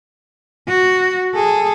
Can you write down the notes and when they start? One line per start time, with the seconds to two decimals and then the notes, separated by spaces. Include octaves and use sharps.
0.68 F#4
1.34 G#4 A4